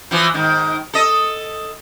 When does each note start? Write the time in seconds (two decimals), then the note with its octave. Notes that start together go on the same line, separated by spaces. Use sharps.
0.11 E3 F3
0.34 G#2 D#3
0.94 A4 D#5